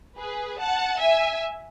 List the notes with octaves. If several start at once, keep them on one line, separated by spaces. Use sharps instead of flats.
G#4 B4
F#5 A5
E5 G#5